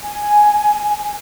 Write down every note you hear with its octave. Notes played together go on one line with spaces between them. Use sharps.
G#5